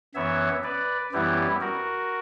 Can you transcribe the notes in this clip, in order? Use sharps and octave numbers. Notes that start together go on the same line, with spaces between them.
F#2 E3 B3 C#5 E5
B4 D5
F#2 E3 G3 B3 E4 G4
F#4 A#4